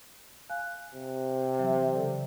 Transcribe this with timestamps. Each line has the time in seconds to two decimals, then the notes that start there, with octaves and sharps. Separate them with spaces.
0.50 F5 G#5 F#6
0.95 C3
1.59 E3 F#3 E5
1.94 C#3 A4 D5